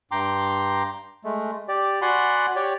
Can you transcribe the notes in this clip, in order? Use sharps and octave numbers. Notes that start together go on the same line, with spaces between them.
G2 G5 A#5 C6 D6
G#3 A3
G4 D5
F#4 D5 F#5 G#5 B5 C6
G4 C#5 D5